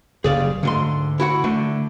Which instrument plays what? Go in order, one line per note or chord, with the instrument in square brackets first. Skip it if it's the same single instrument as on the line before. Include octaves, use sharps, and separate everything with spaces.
[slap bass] F#1 G2 [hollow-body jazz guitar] G#4 D5 F5
[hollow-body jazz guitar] D2 G#2 C6 [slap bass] D3
[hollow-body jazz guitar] E4 F#4 F#5
[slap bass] D3 [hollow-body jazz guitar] A3